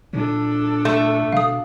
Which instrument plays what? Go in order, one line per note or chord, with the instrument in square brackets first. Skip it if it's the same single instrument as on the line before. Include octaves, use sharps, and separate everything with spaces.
[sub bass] A#2 [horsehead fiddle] D4 A4
[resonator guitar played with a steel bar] A3
[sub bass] B2 [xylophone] F5 D#6